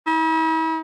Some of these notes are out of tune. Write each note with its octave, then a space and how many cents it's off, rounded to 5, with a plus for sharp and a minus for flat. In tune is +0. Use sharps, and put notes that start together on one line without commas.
E4 -45